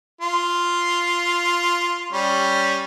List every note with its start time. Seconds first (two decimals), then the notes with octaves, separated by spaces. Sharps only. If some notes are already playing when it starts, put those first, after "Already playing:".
0.21 F4
2.13 G3 C#4